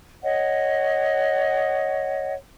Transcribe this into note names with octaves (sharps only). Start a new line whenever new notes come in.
C#5 D#5 F#5